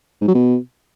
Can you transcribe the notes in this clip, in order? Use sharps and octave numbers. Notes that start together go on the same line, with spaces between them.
G#2
F#3
B2